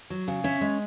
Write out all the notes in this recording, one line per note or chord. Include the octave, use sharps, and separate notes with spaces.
F#3
C#3
C#4 E5
G#3